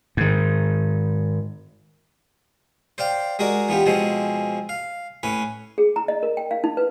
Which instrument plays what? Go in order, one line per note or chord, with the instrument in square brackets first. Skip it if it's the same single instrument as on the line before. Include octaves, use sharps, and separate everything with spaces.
[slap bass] G#2 D#3
[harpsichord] C5 D5 F5 G5
G#3 F#4 A#4 D5
E3 B3 F4 G4
B2 F3 G#3 C4 C#4
F5
A2 C#4 B4
[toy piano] G#4
A#5
D#5
A#4
G5
F5
D#4
B4